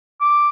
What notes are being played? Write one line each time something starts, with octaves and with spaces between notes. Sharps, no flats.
D6